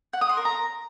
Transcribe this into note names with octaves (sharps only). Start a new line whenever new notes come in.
F#5
D#6
C6
A#4
A#5